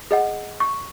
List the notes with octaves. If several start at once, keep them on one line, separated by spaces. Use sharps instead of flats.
G#4 D#5 F#5
C#6